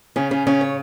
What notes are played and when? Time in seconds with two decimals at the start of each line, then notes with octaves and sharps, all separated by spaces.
0.16 C#3 C#4
0.31 C#3 C#4
0.47 C#3 C#4
0.61 C#5